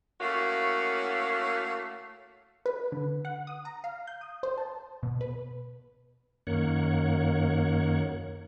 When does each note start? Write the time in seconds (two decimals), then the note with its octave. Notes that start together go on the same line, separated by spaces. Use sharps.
0.21 A2 A3 A#3 C#4 F#4 F5
2.66 B4
2.92 D3
3.25 F#5
3.47 D#6
3.65 A#5
3.84 F5
4.07 G6
4.21 D#6
4.43 C5
4.57 A5
5.03 B2
5.21 B4
6.47 F#2 D#3 A#3 C#5 F#5